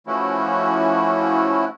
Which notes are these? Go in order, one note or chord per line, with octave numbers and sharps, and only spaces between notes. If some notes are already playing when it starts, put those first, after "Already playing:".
E3 F3 A3 C#4 E4 F#4